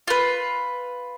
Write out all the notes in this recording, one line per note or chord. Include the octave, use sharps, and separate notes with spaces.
F4 B4